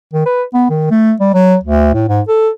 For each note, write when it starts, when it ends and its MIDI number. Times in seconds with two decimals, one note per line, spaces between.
0.13 0.25 51
0.26 0.43 71
0.54 0.65 59
0.70 0.89 51
0.91 1.13 57
1.20 1.31 55
1.34 1.56 54
1.63 1.93 38
1.94 2.07 45
2.09 2.21 44
2.28 2.49 69